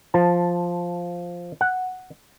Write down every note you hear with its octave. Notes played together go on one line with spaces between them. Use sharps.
F3 A5
F#5